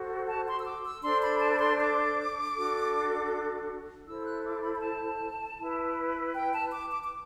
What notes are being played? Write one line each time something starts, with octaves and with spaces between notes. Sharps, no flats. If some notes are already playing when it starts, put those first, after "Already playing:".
Already playing: F#4 A4 C5
A5
C6
E6
D6
E6
D4 A4 C5 C6
B5
A5
B5
C6
D6
D4 F#4 A4
E4 A4 C5 E6
E6
F#6
D6
B5
B5
A5
E4 B4
G5
A5
D6
D6
D6